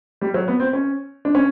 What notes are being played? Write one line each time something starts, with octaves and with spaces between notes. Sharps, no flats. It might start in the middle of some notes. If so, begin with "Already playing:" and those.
G3
F#3
B3
C4
C#4
D4
C#4